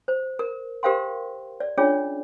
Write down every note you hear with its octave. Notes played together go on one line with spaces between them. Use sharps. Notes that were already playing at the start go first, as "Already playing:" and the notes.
C5
A#4
G4 A#4 C5 F5 G5 C6
D5
C#4 D4 F4 G#4 C#5 D5